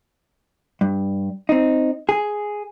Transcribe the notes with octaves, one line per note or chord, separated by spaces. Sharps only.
G2
C4 D#4
G#4